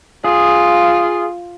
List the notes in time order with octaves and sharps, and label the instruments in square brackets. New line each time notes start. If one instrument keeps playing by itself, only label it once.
[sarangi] F4 [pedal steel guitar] G#4